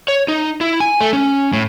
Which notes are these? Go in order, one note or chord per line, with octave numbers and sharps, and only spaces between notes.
C#5
D#4
E4
G#5
A3
C#4
A2